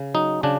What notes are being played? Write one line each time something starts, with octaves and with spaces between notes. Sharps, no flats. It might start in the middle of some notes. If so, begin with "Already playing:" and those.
Already playing: C#3
F#3 D#4
C#3 D4